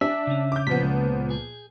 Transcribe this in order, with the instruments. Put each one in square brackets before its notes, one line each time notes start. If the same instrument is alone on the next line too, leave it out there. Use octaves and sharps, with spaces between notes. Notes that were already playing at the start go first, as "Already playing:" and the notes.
[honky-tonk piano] D4 [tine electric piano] E5 [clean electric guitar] G#5
[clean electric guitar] C#3 C#4
[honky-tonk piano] D6 G6
[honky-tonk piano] A#2 F3 B3 [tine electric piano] B6
[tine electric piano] C#2
[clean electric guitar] G#4